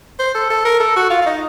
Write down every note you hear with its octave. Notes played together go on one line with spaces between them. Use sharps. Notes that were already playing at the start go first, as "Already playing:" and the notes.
C5
A4
A4
A#4
A4
F#4
F4
F4
D#4